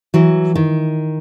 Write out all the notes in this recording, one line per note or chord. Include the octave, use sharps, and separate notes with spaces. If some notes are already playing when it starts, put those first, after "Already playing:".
E3 F#3
D#3